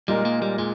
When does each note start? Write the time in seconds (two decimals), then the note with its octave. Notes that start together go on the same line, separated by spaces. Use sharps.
0.08 A#2 G3 G#3 D#4 A#4
0.25 A#3
0.42 G3
0.58 A#2 G#3